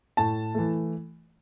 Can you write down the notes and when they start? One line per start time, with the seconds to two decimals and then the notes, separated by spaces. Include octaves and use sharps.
0.17 A2 A5
0.54 E3 A3